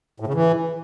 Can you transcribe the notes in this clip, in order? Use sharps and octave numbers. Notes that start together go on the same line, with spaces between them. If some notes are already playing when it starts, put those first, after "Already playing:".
A2
C#3
E3